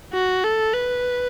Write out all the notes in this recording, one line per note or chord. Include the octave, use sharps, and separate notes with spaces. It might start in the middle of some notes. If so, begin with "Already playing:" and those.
F#4
A4
B4